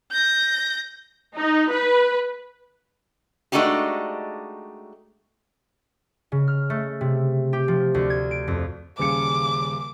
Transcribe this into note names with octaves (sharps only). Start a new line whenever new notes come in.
G6 A#6
D#4
B4
G#3 A3 D4 D#4 F#4 G4
C#3
F6
A3
C3
G4
F3
D2
G#6
D7
F2
D#1 C#3 D6 C#7